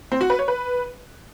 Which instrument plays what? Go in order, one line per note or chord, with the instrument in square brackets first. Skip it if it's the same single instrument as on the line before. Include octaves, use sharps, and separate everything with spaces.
[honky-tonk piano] C4
F#4
B4
C#5
B4